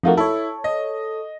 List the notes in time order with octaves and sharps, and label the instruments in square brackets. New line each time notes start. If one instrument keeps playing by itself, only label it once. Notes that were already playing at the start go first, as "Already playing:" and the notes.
[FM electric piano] F2 A3 A#3 [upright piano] D#4 F4 F#4
[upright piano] E4 [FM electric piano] A4 C#5
[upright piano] D#5